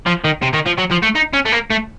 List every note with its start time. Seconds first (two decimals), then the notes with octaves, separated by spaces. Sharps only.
0.06 F3
0.24 D#3
0.43 C3
0.54 D#3
0.67 F3
0.78 F#3
0.91 F3
1.03 A3
1.16 D#4
1.34 C#4
1.46 A3
1.52 A#3
1.70 A3